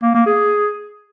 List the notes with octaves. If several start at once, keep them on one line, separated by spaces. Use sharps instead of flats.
A#3
A#3
G#4